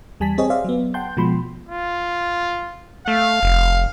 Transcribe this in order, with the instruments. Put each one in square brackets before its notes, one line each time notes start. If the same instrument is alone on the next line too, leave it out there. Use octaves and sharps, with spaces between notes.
[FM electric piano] E2 G3 G#5 A5 B6
C4 G4 G#4 C5 C#5 D#5
G#4 C5 D5 E5 F5
F#3 B3
F#5 G5 A5 C6 G6
B2 F3 G#3 B5 C6
[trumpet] F4
[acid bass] A3 [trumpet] F5
[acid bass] F1